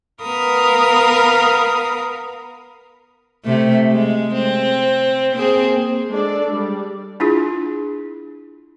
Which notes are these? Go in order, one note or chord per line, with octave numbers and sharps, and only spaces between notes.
B3 A#4 F5 B5 D#6
C3 A3
G#3
C4
A#3 C4 G#4
G#3 D4 A4 D5
G3
D4 E4 F4 G#4